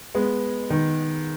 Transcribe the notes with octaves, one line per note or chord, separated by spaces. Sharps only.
G#3 B3
D#3